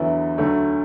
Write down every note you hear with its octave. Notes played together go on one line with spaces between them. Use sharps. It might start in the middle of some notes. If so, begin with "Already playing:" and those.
Already playing: E2 D3 F#3 B3 E4
D2 D3 F#3 A3